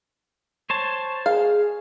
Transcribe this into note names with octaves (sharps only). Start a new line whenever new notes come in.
C5 C#5 A5
G#4 F5